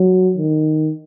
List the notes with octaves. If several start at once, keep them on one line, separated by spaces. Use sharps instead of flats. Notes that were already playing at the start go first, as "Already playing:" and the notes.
Already playing: F#3
D#3